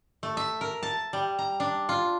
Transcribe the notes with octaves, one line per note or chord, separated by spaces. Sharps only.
A3
E5
A#4
A5
G3
A#5
D4
F4